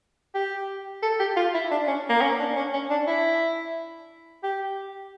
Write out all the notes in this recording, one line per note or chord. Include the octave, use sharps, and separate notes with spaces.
G4
A4
G4
F4
E4
D4
C#4
A#3
C#4
D4
C#4
C#4
D4
E4
G4